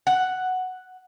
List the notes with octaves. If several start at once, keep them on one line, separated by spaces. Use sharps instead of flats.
F#5